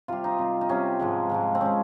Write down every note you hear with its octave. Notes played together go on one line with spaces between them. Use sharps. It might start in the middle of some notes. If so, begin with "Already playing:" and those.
C3 G3 F4
D#4
C3 G3
D#4
C3 G3 C#4
G#2 F3 G#3
G#2 F3 G#3
C4
F3 G#3 C#4